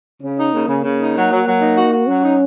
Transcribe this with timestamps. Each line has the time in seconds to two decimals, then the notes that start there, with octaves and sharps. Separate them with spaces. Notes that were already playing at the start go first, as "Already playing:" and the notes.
0.21 C#3 C#4
0.38 D#4
0.53 C#3 A#3
0.68 C#3
0.84 C#3
0.99 D#4
1.16 F#3
1.31 F#3
1.46 F#3
1.62 D#4
1.77 F#4
1.93 F#4
2.08 F#3 C#4
2.24 D#4